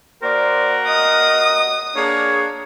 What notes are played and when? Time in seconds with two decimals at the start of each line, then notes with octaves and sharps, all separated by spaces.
0.23 A#3 F#4 A#4 C5 D5 F#5
0.88 D#5 D#6
1.96 A#3 D4 G#4 C#5